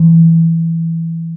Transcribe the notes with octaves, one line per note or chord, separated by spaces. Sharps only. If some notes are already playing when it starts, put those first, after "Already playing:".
Already playing: E3